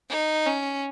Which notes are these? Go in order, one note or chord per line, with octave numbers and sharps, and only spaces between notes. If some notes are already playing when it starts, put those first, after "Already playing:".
D#4
C#4